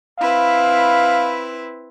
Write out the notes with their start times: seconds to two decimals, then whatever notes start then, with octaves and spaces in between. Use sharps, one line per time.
0.20 C4 E4 B4 F5